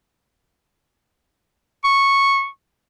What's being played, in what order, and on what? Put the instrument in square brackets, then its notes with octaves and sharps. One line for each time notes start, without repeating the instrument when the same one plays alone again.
[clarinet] C#6